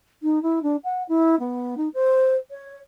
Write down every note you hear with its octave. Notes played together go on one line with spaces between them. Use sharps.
D#4
E4
D4
F#5
E4
B3
D#4
C5
C#5